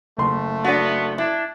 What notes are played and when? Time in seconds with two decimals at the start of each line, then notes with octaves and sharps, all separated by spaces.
0.18 F#1 A3 C6
0.64 B3 D4 F#4
1.18 D4 E4